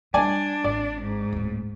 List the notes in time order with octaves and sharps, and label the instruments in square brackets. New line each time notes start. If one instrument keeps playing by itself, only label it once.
[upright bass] G3 G#3 [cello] D4 [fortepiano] D5 G#5 A5
[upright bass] G#1 [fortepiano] D5
[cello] G#2
[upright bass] D1 A2